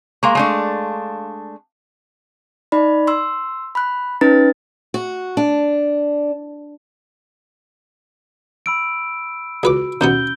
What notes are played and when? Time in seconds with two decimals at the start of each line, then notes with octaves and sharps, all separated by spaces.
0.23 G#3 A#3 F5 C6 C#6
0.35 G#3 A3 D4
2.72 D#4 D5 B5
3.07 C6 E6
3.75 B5 F#6
4.21 C#4 D#4 B4 A#5 A6
4.94 F#4
5.37 D4
8.66 B5 E6 D7
9.63 C#2 F#4 B4 D6
10.01 D#2 B2 B3 C#4 G6 G7